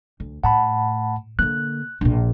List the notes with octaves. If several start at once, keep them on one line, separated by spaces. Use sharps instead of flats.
D2
A2 F#5 A5 B5
D3 A#3 F#6
A#1 A#2